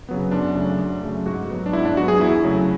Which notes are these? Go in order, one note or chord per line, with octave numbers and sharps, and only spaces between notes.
C#3 F#3 B3
F#2 D4
C#3 F#3 A3
F#2
C#3 F#3 A3
G#2 F#4
F#3 B3
D4
G#2 E4
D4
F#3 B3 F#4
G#4
E2 E4
C#3 F#3 A3